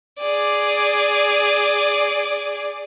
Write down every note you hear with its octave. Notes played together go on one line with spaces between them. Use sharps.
G#4 D5